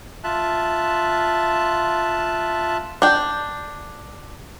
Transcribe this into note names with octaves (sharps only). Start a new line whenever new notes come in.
F4 E5 A5 F#6
D4 G5